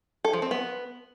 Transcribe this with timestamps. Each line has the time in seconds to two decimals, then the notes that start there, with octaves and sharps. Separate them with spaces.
0.25 A4
0.33 F3
0.42 C4
0.51 B3